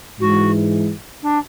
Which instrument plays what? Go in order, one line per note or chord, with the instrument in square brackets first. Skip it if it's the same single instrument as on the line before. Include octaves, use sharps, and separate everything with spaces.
[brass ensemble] G#2 E3 G#3 [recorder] F#4
[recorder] D4